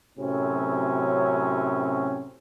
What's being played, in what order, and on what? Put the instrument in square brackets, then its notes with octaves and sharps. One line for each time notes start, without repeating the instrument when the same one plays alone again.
[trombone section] F#2 A2 C3 F#3 C4 C#4